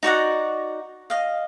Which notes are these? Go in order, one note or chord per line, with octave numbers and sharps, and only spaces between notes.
D#4 F#4 D5 F#5
D#5 F5